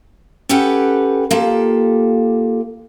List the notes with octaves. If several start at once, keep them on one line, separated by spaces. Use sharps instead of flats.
C#4 G4 A4 B4 F#5 G5
A#3 F4 G4 A4